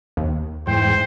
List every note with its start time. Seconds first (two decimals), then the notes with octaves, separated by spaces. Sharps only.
0.17 D#2
0.67 E2 G#2 C5 G5